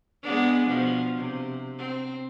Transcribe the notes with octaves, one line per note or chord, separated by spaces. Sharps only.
G#3 B3 D4
B2 F3
C3
C4